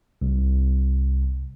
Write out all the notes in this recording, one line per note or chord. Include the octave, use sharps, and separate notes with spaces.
C2